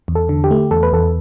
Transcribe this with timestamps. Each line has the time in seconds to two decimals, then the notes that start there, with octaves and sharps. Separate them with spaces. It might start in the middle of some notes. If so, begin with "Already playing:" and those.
0.08 E2
0.15 A4
0.29 D3
0.44 G4
0.51 A3
0.71 E2 A4
0.83 B4
0.92 E2 A4